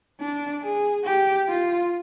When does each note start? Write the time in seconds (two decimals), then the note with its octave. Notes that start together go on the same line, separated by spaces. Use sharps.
0.20 D4
0.62 G#4
1.05 G4
1.48 F4